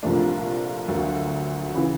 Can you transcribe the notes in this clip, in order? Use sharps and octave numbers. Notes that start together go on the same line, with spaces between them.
C2 A#2 F3 A3 D4
D2 D3 F#3 A#3
C#3 E3